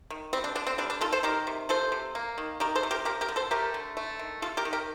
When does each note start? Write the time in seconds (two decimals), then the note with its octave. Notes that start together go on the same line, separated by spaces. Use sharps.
0.10 D#3
0.33 G3 C4
0.44 D4
0.55 D3 D4
0.67 C4
0.78 G3 D4
0.90 D4
1.01 D#3 F4 A4
1.12 A4 C5
1.23 D#3 G4 A#4
1.47 C3
1.69 F3 A4 C5
1.92 C3
2.15 A#3
2.38 D#3
2.60 D#3 G4 A#4
2.75 A4 C5
2.83 C3
2.91 G4 A#4
3.05 F3 G4 A#4
3.21 G4 A#4
3.29 D3
3.36 A4 C5
3.51 A3 G4 A#4
3.74 D3
3.97 A3
4.19 D#3
4.42 G3 F4 A4
4.57 G4 A#4
4.65 D#3
4.73 G4 A#4